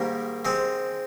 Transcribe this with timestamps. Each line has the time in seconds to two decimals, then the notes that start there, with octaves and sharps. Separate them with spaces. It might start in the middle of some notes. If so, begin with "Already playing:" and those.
Already playing: G#2 D#3 G3 A#3
0.45 G#3 C4